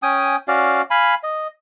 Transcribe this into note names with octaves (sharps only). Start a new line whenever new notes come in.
C#4 G5 G#5 D#6
C#4 F#4 D5 F5
F5 G#5 B5
D#5